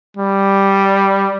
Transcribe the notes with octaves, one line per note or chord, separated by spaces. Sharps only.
G3